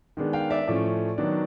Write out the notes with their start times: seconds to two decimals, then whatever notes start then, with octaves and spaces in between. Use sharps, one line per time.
0.17 D#3 G#3 B3 D4
0.33 F5 G5
0.50 D5 E5
0.67 A2 F3 A3 C#4 D5
1.18 D#3 F#3 B3 D4